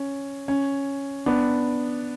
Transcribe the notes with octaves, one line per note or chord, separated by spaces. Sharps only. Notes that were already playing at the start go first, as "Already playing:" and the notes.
Already playing: C#4
C#4
B3 D4